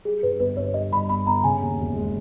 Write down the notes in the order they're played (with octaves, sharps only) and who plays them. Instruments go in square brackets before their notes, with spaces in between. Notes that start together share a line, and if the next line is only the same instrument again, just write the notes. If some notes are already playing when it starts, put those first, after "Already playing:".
[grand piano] G3 [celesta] G#4
[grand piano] G2 [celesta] B4
[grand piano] G1 [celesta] B4
[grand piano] G1 [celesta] C#5
[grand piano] G3 [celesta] D#5
[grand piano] G2 [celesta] B5
[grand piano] G1 [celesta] B5
[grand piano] G1 [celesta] A#5
[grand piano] C#3 [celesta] G#5
[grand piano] D#2
E1
G#3